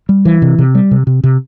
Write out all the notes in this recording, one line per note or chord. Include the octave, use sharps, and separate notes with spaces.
G3
E3
C3
C3
G3
C3
C3
C3